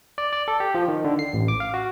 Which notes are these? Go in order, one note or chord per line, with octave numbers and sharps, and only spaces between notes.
D5
D5
A4
G4
F3
D#3
D3
C7
A1
D6
F5
F#4